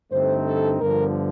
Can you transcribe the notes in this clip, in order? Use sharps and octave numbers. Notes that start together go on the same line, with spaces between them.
G2 D3 A3 C4 D#4 C5
A4
G1 G2 D3 F3 A#4